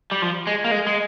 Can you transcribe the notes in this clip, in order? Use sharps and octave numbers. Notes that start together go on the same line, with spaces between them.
G3
F3
G#3
A#3
G#3
G#3